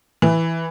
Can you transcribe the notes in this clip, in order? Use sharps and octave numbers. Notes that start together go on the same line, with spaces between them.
E3